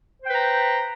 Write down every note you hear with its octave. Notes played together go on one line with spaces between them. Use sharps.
B4 C5 G5 A#5